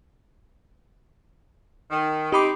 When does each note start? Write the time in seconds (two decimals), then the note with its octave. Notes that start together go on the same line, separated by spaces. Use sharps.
1.91 D#3
2.32 C4 D#4 G4 B5 D6